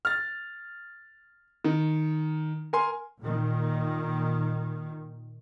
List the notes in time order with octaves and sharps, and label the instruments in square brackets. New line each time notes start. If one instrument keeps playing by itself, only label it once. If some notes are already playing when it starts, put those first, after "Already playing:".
[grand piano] F6 A6
D#3
A#4 G#5 C6
[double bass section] A#2 D#3